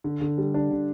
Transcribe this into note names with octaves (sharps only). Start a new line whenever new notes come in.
D3
D3
G3
D4
D3